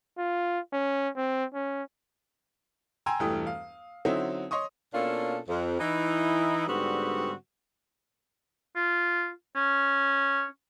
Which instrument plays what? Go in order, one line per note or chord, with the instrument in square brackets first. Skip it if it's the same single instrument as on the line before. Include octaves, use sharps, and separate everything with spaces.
[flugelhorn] F4
C#4
C4
C#4
[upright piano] G5 G#5 A#5 C6 E6
E1 G2 E3 A3 G5 D#6
F5
D3 F#3 C4 C#4 D#4 E4
C#5 D#5 C6 C#6 D#6
[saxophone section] B2 A#3 C#4 D4 F4 A4
F2
E3 D#4 E4
G#2 D3 G3 B3 C4 F#4
[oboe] F4
C#4